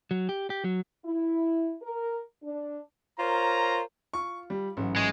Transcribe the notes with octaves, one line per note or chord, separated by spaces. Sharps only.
F#3
G4
G4
F#3
E4
A#4
D4
F4 A#4 C5 C#5 A#5
F4 C#6
G3
A1 G#2 F#3
G#3 G#5 C#6